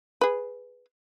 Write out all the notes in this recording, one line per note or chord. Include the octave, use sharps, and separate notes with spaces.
G#4 B4